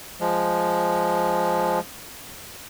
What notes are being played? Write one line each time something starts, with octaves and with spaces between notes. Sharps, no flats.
F3 G#3